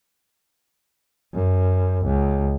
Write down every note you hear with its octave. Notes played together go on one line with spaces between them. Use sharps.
F#2
C#2